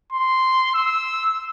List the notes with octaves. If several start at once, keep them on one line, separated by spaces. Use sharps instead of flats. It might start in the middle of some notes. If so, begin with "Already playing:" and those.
C6
E6